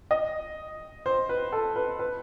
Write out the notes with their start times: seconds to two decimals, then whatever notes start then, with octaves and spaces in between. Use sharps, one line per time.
0.11 D#5
1.06 C5
1.29 B4
1.52 A4
1.76 B4
1.99 B4